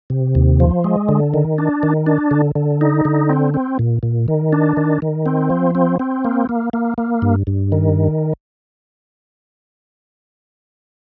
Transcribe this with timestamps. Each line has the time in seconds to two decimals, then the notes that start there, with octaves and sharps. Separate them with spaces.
0.10 C3
0.35 D#2
0.60 F3
0.84 G#3
1.09 D3
1.34 D#3
1.58 D4
1.83 D#3
2.06 D4
2.31 D3
2.55 D3
2.81 D#4
3.05 D3
3.29 C4
3.54 C4
3.79 A#2
4.03 A#2
4.28 D#3
4.53 D4
4.77 D#3
5.02 D#3
5.26 C4
5.50 F3
5.75 C4
5.99 C4
6.25 A#3
6.49 A#3
6.73 A#3
6.98 A#3
7.22 G2
7.47 G2
7.72 D#3